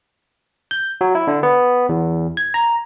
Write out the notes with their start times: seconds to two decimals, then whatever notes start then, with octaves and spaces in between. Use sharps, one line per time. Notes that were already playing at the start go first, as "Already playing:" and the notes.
0.71 G6
1.01 F#3
1.15 E4
1.27 D3
1.43 B3
1.89 E2
2.37 G#6
2.54 A#5